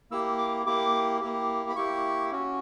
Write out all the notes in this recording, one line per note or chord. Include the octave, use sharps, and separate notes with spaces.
A#3 E4 G4 E6
D6
A#3 E4 G4 D6
A#3 E4 G4
B5
A#3 E4 G4 C#6
C#4 F#4